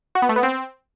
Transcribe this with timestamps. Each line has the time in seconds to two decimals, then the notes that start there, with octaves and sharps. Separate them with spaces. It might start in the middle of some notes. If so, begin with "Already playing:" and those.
0.15 F#4
0.22 B3
0.29 A3
0.36 B3
0.43 C4